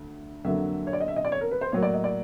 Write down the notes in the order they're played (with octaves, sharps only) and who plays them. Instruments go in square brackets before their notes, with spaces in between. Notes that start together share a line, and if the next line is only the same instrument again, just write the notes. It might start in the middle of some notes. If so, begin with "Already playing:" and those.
Already playing: [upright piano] D2
F2 D3 F#3 A#3 E5
C#5
D5
D#5
E5
D#5
D5
C#5
A#4
B4
C5
A2 F#3 A#3 C#5
D5
D#5
D5